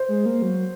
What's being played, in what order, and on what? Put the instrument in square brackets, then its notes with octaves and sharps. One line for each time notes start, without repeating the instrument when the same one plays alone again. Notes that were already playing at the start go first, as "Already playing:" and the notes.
Already playing: [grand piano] C5
[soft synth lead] G#3
A#3
F#3